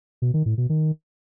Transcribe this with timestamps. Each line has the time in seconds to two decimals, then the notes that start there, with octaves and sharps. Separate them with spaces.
0.22 B2
0.34 D#3
0.46 A2
0.58 B2
0.69 D#3